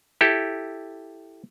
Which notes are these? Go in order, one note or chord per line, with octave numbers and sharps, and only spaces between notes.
E4 G4 A4